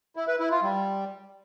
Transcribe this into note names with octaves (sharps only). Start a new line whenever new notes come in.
E4
B4
E4
F4
G3